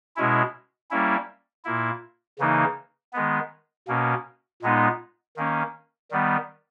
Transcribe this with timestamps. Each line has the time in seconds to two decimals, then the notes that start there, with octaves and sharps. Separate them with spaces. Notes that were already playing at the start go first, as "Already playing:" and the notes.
0.16 B2 G#3 C#4 E4
0.91 G3 A#3 C#4 E4
1.65 A#2 A#3 E4
2.39 C#3 E3 A#3 D#4
3.13 D#3 G#3 B3
3.88 B2 A#3 C#4
4.62 A#2 G#3 B3 D#4
5.37 D#3 A#3 C#4
6.11 D#3 G3 B3